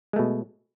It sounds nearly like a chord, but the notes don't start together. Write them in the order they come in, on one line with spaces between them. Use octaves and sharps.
G#3 A3 B2